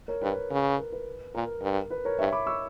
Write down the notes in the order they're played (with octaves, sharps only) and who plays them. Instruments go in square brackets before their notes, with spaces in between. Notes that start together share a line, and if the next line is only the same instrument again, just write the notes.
[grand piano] A#4 C#5
[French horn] G2 [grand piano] B4
[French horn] C#3
[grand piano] A#4
B4
[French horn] A#2 [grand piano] A#4
[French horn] G2
[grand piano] B4
A#4 C#5
[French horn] G2 [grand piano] C#5 E5
[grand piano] B5 D6
C#6 E6